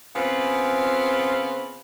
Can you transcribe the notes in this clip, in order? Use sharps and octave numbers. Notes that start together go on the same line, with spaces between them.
C#3 B3 C4 F4